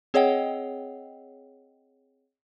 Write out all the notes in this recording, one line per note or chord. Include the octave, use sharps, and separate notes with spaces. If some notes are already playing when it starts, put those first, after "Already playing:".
C4 G#4 C#5 D#5 F#5 G5